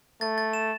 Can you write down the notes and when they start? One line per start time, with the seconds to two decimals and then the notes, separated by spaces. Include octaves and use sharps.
0.21 A3 A6
0.38 A6
0.53 E7